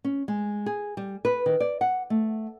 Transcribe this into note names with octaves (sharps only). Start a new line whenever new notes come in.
C#4
G#3
G#4
G3
B4
D#3
D5
F#5
A3